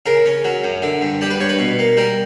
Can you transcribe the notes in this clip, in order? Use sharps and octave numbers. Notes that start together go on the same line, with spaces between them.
C#3 A#4
C#4
F#3
F#2
D3
G2
G3 G4
B4
G2 C#5
B4
B2
A#3
G3 A#4